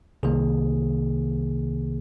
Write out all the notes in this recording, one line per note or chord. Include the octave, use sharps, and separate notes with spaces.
C2 C3 D#3 A#3 G#4